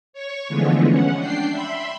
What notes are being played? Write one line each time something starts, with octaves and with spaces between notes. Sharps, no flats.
C#5 C#6
D3 E3 F3 G#3 A3 B3
C#4 F#5
D4 G5 C7
E5 B5 C6